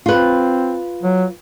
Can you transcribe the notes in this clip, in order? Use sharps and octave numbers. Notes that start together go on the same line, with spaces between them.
C4 F4 B4
F#3